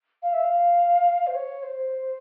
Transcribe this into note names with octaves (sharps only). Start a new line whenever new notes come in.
F5
E5
F5
C5
C#5
C5